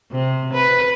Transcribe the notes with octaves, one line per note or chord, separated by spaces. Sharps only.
C3
B4